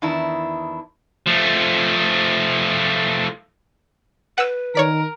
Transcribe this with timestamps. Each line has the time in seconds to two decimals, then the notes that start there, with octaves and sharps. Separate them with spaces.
0.02 E2 D#3 D4 E4
1.27 F3 A3
4.38 B4 F#5 E6
4.75 D#3 A#4 C#5 D5 B6